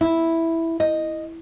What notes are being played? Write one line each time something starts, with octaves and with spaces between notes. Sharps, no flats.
E4
D#5